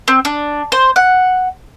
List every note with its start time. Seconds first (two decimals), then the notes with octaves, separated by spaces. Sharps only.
0.08 C4
0.25 D4
0.72 C5
0.96 F#5